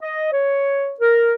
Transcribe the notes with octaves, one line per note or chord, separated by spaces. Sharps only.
D#5
C#5
A#4